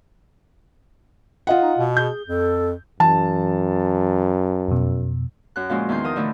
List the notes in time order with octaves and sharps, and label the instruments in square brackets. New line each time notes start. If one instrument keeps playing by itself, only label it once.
[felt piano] F4 D#5 F#5
[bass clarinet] D#4
B2
[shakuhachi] G#4 [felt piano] G6
[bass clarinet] F2 [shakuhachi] A4
[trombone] F#2 [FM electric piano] E3 [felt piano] A5
[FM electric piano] F2 B2
[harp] F#2 F#6
A#2 F3 G#3 C#4 F#4
E2 D#3 D#4 C6 G6
F3 A#4 D#6
A2 D3 E3 A3 D#4 E4